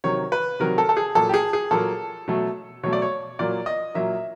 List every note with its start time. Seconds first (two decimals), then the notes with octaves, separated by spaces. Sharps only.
0.04 C3 D#3 F#3 C#5
0.32 B4
0.60 C3 D#3 F#3 A#4
0.78 A4
0.89 A4
0.97 G#4
1.15 A#2 F#3 A#3 A4
1.29 G4
1.34 G#4
1.53 G#4
1.71 A#2 F#3 A#3 A4
2.28 B2 F#3 A3
2.83 B2 F#3 A3 C#5
2.93 D5
3.02 C#5
3.39 A#2 F#3 A#3 D5
3.66 D#5
3.94 A#2 F#3 A#3 E5